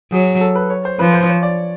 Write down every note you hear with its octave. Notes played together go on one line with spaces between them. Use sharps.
F#3 G#4
A4
B4
C#5
C5
F3 B4
C5
C#5
D5